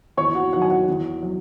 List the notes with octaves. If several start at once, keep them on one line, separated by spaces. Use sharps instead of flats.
E2 C#5 C#6
F#4 F#5
D#3 F#3 F#4 F#5
G#5
F#4 F#5
E2
F#3